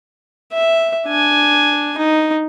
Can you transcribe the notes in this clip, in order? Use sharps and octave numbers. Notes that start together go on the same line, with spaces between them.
E5
D4 G#5
D#4